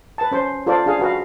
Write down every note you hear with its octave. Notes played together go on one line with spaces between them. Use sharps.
B4 A5
C#4 C5
F4 A4 C5 D5
D4 G#4 F5
F#4 B4 F5